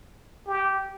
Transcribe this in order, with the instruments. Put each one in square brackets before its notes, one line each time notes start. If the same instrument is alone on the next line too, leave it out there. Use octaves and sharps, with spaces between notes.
[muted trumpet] G4